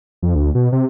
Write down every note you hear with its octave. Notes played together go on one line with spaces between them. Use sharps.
F2
D2
B2
C3